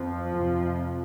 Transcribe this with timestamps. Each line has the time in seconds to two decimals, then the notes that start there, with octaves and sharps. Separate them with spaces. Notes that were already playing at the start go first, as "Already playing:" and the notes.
Already playing: F2 F3
0.35 F2 C3